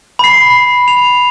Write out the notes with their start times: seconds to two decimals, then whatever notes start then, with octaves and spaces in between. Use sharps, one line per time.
0.19 B5 C7
0.88 F7